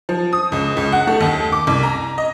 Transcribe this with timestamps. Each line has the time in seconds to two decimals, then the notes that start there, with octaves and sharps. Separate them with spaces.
0.09 F3
0.33 D#6
0.52 C#2
0.77 C#2
0.92 F#5
1.07 A3
1.21 D#2
1.52 D6
1.67 C2
1.83 A#5
2.18 D#5